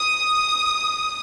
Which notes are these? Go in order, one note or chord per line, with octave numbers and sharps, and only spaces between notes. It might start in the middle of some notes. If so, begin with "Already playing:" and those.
Already playing: D#6